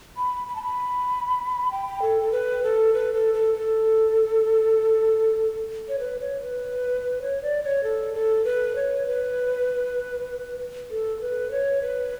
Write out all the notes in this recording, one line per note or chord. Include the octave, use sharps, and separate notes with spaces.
B5
B5
A5
B5
G5
A4
A4
B4
A4
B4
A4
A4
A4
C#5
B4
C#5
B4
C#5
D5
C#5
A4
A4
B4
C#5
B4
A4
B4
C#5
B4